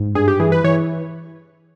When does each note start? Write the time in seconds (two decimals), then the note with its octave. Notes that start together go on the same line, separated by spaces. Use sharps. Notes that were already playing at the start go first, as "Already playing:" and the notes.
Already playing: G#2
0.15 G2 G#4
0.28 G4
0.40 E3 G#4
0.52 B4
0.64 E3 C#5